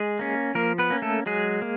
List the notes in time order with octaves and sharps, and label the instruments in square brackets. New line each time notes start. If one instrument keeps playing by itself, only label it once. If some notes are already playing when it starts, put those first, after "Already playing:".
Already playing: [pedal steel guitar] G#3 G#4
A#3 C#4
F3 A#3 A#4
B3 B4
A#3 C#4
A3 A4
F#3 G#3 G#4
A#3